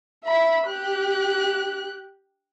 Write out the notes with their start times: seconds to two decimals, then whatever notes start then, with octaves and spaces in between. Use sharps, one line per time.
0.24 E5 B5
0.66 G4 F#6